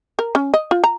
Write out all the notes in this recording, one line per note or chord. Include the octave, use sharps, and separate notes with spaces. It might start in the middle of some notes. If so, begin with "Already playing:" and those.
A#4
C#4
D#5
F4
A#5